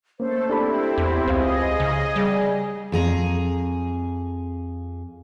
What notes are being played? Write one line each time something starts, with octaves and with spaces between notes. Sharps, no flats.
A3 A#3 C#4 A4 C5
C4 D4 E4 G4 A4 B5
E2
C#2 G#4 C5 D#5 F5
C#3
G3 G#4
F2 G#4 A#5